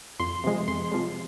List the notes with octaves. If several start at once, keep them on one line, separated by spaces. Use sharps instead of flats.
F2 C6
C3 F3 G#3
F2 C6
C3 F3 G#3